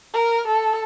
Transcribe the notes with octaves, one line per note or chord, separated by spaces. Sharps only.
A#4
A4